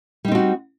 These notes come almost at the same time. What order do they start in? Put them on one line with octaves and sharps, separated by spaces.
G3 D#4 C4 F#4